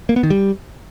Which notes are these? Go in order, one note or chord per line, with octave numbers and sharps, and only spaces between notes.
A#3
B3
D#3
G3